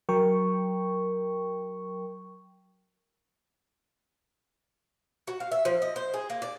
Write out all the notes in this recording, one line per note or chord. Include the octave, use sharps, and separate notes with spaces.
F#3 A#4 G5 C#6
F#4
F5
E5
F3
D#5
C5
G#4
A#3
D5